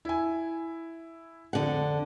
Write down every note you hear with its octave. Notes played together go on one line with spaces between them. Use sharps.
E4 G#5
F2 D3 F#5